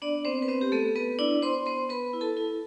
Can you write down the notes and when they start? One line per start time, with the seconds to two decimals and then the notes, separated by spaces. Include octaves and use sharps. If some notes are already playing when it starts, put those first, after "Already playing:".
0.02 B3 D4 D5
0.25 B3 C4 C5
0.42 B4
0.48 B3 C4 C5
0.61 G4
0.72 A3 B3 A4
0.95 B3 B4
1.19 D4 E4 D5
1.42 B3 C5 C6
1.66 B3 C5 C6
1.89 B3 B4 B5
2.13 E4
2.21 A4 A5
2.37 E4